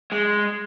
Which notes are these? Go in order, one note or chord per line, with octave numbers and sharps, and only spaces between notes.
G#3